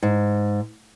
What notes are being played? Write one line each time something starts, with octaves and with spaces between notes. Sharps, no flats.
G#2